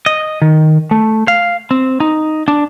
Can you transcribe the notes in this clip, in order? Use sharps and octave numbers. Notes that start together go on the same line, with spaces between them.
D#5
D#3
A3
F5
C4
D#4
D4